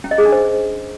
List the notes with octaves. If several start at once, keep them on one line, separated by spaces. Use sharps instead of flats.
C#4
D#5
G#4
D4
C5